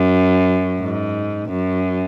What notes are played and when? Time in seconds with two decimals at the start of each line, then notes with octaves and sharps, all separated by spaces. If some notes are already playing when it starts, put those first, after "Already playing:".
Already playing: F#2
0.80 G#2
1.50 F#2